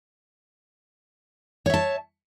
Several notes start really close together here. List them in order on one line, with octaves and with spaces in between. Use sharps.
C#5 E5 A5